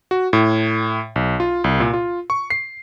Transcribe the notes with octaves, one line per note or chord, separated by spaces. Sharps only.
F#4
A2
B1
F4
C2
A#2
F4
C#6
C7